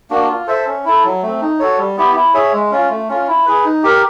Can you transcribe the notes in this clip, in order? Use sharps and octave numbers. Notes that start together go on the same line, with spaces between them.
A#3 D4 F#4
F4
A4 C5 E5
C#4
E4 A4
F#3
A3 C4
D#4
F#4 A4 C#5
G3
B3 E4 G4
E4
G#4 C#5 E5
G#3
C#4 F4
A3
C#4 F4
E4
G#4 B4
D#4
G4 A#4